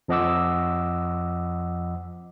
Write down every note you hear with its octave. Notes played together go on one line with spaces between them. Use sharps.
F2 F3 D#5 F#5 D6 E6